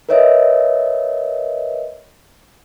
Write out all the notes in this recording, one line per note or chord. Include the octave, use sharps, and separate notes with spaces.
A#4 B4 C#5 D#5 E5